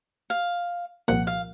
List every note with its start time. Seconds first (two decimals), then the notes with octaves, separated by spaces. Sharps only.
0.30 F5
1.08 C2 A#2 F3 A#3 F#5
1.27 F5